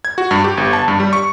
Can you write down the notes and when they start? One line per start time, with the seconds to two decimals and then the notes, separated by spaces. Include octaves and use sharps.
0.05 G#6
0.18 F#4
0.31 G2
0.44 G4
0.57 G1
0.73 A5
0.88 G2
1.00 G3
1.13 C#6